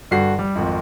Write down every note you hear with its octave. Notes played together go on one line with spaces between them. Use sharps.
G2 D3 F#4 C7
G3
G#1 F2